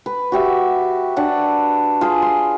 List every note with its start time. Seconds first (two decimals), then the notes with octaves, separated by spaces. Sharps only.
0.06 B4
0.32 F#4 G4 E5
1.17 D4 F#5 A5
2.01 F4 G#4
2.22 C6